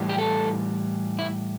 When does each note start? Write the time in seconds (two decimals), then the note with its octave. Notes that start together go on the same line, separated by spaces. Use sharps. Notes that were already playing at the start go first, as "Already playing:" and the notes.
Already playing: A2 E3 G3
0.09 G4
0.18 A4
1.19 E4